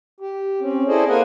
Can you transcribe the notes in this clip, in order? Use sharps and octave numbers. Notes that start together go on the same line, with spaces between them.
G4
C4 C#4
E4 G#4 A4 C5 D5 D#5
A#3 A#4 C5 F#5 G#5